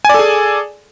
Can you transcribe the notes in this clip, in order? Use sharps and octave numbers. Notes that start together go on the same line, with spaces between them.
G#4 A4 D5 G#5